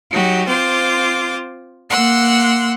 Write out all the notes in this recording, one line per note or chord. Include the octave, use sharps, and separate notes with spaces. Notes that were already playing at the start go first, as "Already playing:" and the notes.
F#3 D#4 F#4 G4
C4 F4 C5 D6
A#3 F#5 C6 E6 F#6